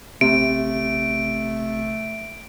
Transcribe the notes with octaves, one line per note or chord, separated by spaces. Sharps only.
A1 C3 A3 D7